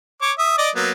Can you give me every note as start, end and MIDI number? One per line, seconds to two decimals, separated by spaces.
0.22 0.32 73
0.22 0.32 86
0.38 0.56 76
0.38 0.56 87
0.58 0.70 74
0.58 0.70 75
0.58 0.70 86
0.76 0.92 54
0.76 0.92 58
0.76 0.92 59